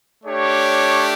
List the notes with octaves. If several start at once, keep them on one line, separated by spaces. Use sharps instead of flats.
A3 D4 G4 C#5